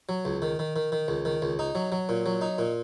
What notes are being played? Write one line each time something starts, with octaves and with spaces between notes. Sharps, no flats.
F#3
C#2
D#3
D#3
D#3
D#3
C#2
D#3
C#2
D#4
F#3
F#3
A#2
F#3
D#4
A#2